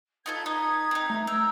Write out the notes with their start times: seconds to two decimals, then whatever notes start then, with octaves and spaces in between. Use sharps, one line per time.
0.26 D#4 F4 A4 B4 G#6
0.46 D#4 D#6
0.91 C4 D#4 A#5
1.10 A3
1.27 A#4 A#5 E6 G6